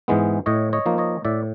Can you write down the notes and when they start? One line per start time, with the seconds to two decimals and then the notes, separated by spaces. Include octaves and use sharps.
0.08 G#2 E3 G#3 B3
0.46 A2 C#5 D#5
0.73 C#5 D#5
0.86 F3 A#3 D#4
0.98 C#5 D#5
1.25 A2 D5 E5